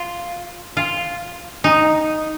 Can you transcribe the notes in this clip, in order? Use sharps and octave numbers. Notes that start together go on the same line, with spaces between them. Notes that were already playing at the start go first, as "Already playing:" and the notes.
Already playing: F4
F4
D#4